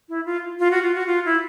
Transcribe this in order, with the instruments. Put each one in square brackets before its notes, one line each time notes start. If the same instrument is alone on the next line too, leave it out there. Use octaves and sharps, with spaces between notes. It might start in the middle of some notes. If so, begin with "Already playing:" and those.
[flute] E4
F4
F4
F#4
F4
F#4
F4
E4